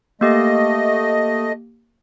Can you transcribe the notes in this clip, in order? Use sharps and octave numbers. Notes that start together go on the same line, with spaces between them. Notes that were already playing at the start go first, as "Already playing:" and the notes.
A3 A#3 G4 D#5